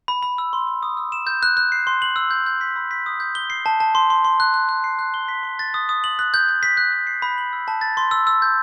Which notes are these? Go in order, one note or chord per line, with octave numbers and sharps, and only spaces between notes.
B5
B5
E6
C6
C6
D#6
E6
E7
G6
F#6
F#6
C7
C6
F#7
E6
G6
G6
B6
B5
B6
D#6
G6
G7
C7
A5
A5
C6
C6
C6
F#6
F#6
F#6
C7
F#6
G7
B6
C6
A6
D#6
D#6
F#7
F#6
G6
G6
B6
F#6
F#6
C7
B5
F#7
E6
A5
A6
C6
E6
E6
G6